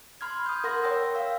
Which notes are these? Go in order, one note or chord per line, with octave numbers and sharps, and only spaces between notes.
B5 C6 F6 G#6
D#6 G6
A#4 F#5 C6 A#6
C#5 G5 E6
F5 E6